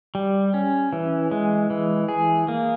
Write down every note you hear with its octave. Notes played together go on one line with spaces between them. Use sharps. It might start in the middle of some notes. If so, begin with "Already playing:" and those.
G3
C#4
E3
G#3
E3
G#4
A#3